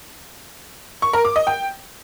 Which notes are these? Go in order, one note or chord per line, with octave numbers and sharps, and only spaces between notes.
C#6
A#4
D6
D#5
G5